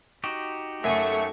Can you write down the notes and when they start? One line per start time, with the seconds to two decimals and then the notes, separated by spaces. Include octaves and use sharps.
0.24 D#4 F#4 G4
0.84 F#2 A3 E5 G#5 C#6